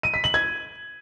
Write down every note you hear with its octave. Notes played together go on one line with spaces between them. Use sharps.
D#7
B6
F#7
G#6